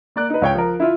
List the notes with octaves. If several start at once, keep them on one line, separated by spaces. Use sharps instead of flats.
A#3 D5 F#6
D#4 B4
C#2 C#5 G5
F3 A#4
E4 F4 E5